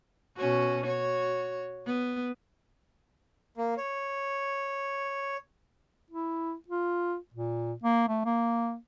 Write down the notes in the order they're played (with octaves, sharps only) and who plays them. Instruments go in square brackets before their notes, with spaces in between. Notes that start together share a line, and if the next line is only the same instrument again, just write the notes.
[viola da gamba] B2 C#4 F#4
F#4 C#5
B3
[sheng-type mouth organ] A#3
C#5
[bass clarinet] E4
F4
A#2
A#3
A3
A#3